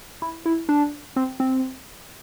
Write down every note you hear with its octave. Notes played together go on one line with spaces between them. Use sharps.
E4
E4
D4
C4
C4